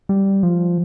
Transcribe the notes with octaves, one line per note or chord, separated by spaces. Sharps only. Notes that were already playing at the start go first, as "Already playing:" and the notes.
G3
F3